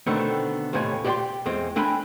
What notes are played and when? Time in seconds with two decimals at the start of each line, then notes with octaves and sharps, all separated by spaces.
0.07 B2 D3 D#3 A3 B3 C4
0.73 D#2 A2 C3 C#5 G#5
1.05 G4 D5 E5 F#5 G5 C6
1.46 E2 G#3 C4
1.76 C4 D4 G5 G#5 B5